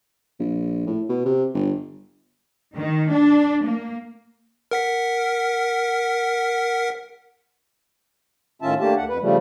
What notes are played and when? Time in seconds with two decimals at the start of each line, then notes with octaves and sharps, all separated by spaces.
0.40 A#1
0.87 A2
1.09 B2
1.25 C3
1.54 G1
2.74 D#3
3.09 D4
3.64 A#3
4.71 A#4 F#5 B6
8.62 A2 D#3 C#4 F4 E5 A5
8.80 A3 A#3 D4 G4 A5
8.97 D2 F#5
9.09 F2 B4
9.21 C#3 F3 G3 A3